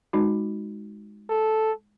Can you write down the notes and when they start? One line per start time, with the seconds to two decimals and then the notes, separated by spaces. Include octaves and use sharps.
0.13 G#3 D#4 F#4
1.29 A4